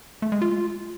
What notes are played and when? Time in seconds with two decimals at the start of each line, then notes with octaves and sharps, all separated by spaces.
0.22 A3
0.32 G#3
0.42 F4